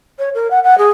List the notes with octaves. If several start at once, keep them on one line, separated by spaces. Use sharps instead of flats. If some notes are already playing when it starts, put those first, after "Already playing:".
C#5
A#4
F#5
F#5
G#4